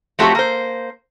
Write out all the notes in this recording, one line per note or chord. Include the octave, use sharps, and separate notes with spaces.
F3 F#3 A3 C4 F#4 G4
A#3 C5